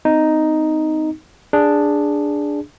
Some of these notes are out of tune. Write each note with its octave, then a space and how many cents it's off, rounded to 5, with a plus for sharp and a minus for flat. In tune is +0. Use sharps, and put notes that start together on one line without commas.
C4 -35 D#4 +0
D4 +0 G#4 -10